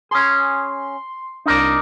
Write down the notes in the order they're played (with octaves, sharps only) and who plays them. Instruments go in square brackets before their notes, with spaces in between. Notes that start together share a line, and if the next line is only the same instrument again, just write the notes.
[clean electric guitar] C#4 G#4 [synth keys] C6
[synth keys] C2 D4 [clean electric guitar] D#4 A#4 D5